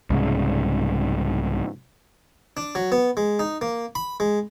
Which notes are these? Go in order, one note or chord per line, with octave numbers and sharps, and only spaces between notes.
C2 G#2 C#3
D4
F#3
B3
G#3
D#4
A#3
B5
G#3